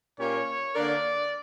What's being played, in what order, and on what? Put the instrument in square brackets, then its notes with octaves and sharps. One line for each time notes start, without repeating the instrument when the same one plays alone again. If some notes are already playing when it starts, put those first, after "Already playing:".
[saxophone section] A#2 A#3 C#4 G4 A#4 [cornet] C#5
[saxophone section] D3 A#3 D4 A#4 [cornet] D5